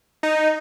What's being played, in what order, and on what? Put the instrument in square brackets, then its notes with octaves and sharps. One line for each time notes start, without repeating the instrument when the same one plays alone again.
[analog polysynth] D#4